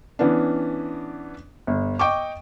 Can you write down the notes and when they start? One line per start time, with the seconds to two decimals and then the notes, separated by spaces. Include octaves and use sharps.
0.19 E3 B3 C#4 D4
1.67 G1
1.99 D#5 G5 C#6 D6